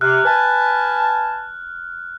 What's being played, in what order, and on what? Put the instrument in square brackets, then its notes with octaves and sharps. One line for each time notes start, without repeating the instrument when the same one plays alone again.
[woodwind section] C3 [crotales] F6 F#6
[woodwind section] B4 G#5 A5